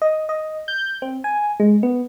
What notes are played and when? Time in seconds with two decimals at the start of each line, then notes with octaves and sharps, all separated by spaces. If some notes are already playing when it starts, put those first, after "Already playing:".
0.02 D#5
0.29 D#5
0.68 G6
1.02 C4
1.24 G#5
1.60 G#3
1.83 B3